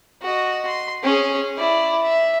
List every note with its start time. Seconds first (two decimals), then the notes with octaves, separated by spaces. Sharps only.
0.22 F#4 D#5
0.67 C6
1.03 C#4 G#4
1.58 E4 D5
2.03 E5